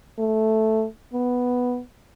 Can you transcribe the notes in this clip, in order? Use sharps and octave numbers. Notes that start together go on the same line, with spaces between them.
A3
B3